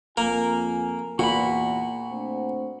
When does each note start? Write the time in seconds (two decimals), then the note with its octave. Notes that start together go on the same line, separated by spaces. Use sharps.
0.17 F2 A#3 F4 A#4 G#5
1.19 E2 A#2 F#4 B5
2.10 A3 C4 D4